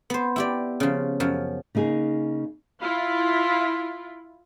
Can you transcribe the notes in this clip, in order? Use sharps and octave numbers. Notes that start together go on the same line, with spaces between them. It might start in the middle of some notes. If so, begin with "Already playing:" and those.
B3 C5
E4 G4 D5
C#3 F3
F#2 F3 C#5
C#3 A#3 D#4 G#4
E4 F4